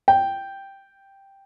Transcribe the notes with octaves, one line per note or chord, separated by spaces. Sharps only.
G5